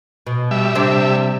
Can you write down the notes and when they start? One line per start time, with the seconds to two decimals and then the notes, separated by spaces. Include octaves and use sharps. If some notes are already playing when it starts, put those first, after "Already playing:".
0.27 B2
0.51 G3 E5
0.75 C3 D4